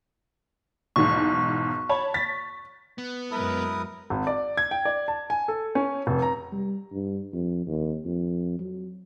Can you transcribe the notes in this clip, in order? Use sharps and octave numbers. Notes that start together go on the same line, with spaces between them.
B1 E2 G#2 C#6
C#5 A5 B5
A6 B6
B3
F#2 G#3 E4 A#4 B4 D#6
G#1
D5
G#6
G5
D5
A5
G#5
A4
C#4
F1
A#5
G3
G2
F2
D#2
F2
F#3